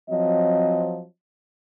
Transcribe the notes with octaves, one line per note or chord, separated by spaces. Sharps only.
F3 F#3 C4 D#5